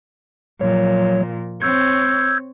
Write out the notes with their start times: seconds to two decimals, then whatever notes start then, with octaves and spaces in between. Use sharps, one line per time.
0.61 A#2 F3 F#3 C#5
1.62 C4 C#5 E6 G6 G#6